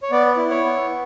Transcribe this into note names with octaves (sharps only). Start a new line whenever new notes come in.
C#5
B3 D5
E4
C#5
B3